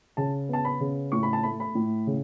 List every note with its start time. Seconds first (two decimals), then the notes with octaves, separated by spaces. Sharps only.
0.17 C#3 A5
0.49 B3 A5
0.65 B5
0.80 C#3
1.12 A2 C#6
1.23 B5
1.33 A5
1.43 A3 B5
1.60 B5
1.75 A2
2.07 C#3